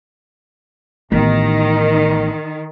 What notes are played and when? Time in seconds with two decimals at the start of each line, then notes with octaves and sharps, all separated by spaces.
1.12 A1 D#3 B3